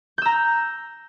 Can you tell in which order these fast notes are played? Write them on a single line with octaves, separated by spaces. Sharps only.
G6 E6 A#5